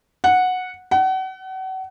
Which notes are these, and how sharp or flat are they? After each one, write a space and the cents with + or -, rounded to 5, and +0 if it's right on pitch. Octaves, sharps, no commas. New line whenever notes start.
F#5 -10
F#5 +35